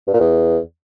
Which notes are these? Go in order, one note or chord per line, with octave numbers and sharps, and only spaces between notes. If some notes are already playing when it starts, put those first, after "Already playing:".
G2
A#2
E2